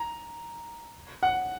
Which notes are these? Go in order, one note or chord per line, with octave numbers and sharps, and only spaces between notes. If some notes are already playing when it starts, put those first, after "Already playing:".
Already playing: A#5
F#5